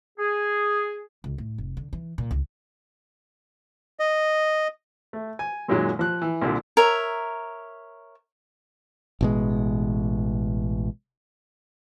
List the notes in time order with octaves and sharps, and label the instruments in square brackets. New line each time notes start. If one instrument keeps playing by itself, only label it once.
[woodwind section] G#4
[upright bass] C#2
A2
F1
D3
E3
A#2
C#2
[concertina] D#5
[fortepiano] A3
G#5
F#2 A#2 D#3 F#3 G#3
F3 F#6
E3
C2 A#2 D3
[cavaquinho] A#4 C#5 E5
[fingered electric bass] A1 B2 G#3